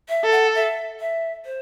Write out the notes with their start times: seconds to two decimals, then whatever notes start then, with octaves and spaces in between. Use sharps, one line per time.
0.09 E5
0.24 A4
0.31 F#5
0.55 E5
1.00 E5
1.45 C5